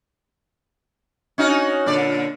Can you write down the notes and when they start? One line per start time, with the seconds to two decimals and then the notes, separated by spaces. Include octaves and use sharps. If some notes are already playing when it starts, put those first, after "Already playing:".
1.38 C#4 D#4 F#4
1.86 A#2 D3 D5